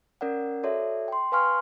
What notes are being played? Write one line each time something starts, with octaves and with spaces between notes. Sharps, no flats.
C#4 A#4 D5 F#5
F#4 A4 C#5 D5 E5
G5 C6
B4 F5 G#5 C6 C#6 F6